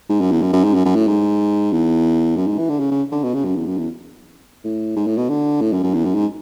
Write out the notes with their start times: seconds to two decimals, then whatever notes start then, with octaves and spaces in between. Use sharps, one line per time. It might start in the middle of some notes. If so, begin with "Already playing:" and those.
0.09 G#2
0.20 F#2
0.31 E2
0.42 F#2
0.53 F#2
0.64 G#2
0.74 F#2
0.85 F#2
0.95 A2
1.07 G#2
1.72 E2
2.36 F#2
2.47 G#2
2.58 E3
2.69 D3
2.80 C#3
2.91 C#3
3.12 D3
3.23 B2
3.34 C#3
3.45 F#2
3.56 E2
3.66 F#2
3.77 E2
4.64 A2
4.96 G#2
5.07 A2
5.17 B2
5.29 D3
5.61 A2
5.73 F#2
5.83 F#2
5.94 E2
6.05 F#2
6.15 G#2